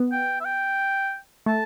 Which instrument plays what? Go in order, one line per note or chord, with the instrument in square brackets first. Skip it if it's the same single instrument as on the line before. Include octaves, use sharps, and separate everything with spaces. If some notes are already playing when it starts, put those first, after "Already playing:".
Already playing: [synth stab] B3
[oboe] G5
E5
G5
[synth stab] A3 [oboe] A5